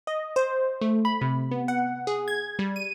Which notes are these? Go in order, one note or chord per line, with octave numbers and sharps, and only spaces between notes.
D#5
C5
A3
B5
C3
B3
F#5
G#4
G#6
G3
D#7